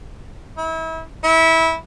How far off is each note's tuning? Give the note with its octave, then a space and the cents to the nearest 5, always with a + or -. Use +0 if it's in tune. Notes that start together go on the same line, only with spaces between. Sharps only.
E4 -35
E4 -20